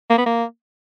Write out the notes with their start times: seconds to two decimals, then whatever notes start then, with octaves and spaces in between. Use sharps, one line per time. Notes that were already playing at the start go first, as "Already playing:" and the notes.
0.10 A#3
0.18 B3
0.26 A#3